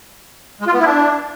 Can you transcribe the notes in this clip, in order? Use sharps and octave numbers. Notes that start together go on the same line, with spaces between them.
G#3
F4
B3
E4
D4